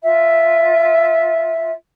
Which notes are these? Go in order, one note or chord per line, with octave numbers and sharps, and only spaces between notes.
F4 E5